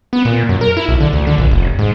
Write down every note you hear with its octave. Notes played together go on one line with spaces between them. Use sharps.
B3
A#2
F#2
A#4
E4
B1
D3
D2
D3
A#1
F1
G#2